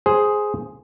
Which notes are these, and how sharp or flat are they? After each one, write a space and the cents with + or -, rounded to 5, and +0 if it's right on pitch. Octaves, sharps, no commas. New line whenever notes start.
G#4 +5 C5 +0